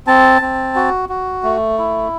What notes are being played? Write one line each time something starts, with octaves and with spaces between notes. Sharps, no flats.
C4 A5
C4
F#4
F#4
A3
E4